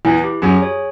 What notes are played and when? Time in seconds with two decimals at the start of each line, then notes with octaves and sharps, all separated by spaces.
0.05 E2 E3 E4
0.24 G4
0.42 F#2 F#3 G#4
0.62 C#5